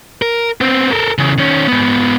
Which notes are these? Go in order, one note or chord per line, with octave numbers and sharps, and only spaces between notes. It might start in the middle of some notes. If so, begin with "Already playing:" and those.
A#4
B3 C4
A4 A#4
C#3 E3
D#3 C#4
G#2 B3